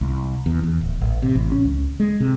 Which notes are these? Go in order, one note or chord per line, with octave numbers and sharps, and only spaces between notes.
C2
E2
E2
D1
A1
C3
A1
C#4
C#2
G#3
C3